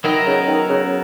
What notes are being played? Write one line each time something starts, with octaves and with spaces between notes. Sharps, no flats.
D#3 F#3 B3 E4 A#4 D#5
C#3
D#3
C#3